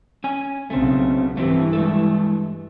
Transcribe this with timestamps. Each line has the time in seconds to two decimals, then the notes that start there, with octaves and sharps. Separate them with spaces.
0.24 C#4 G#5
0.70 B1 C#3 A3 C4
1.37 G2 E3 A3 C4 G4
1.73 G#3 A3 A4